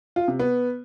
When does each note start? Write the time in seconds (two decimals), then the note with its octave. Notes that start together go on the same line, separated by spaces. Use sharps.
0.16 F4
0.28 C3
0.39 B3